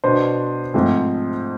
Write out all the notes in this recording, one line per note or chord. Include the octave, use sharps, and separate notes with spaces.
B2 B3 D4 C5
G#2 F3 A3 C4